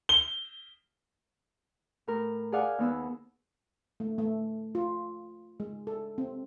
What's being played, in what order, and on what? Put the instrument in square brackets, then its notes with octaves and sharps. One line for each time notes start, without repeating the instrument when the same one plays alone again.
[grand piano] G7
[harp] A2 A#4
G#4 D5 F5 F#5 G#5
D#2 B3 E6
[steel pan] A3
A3
F4
G#3
A4
C4